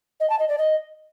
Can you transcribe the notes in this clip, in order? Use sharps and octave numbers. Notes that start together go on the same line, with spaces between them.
D#5
A5
D#5
D5
D#5